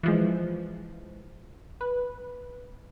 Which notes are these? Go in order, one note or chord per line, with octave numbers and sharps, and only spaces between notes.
E3 F3 G#3
B4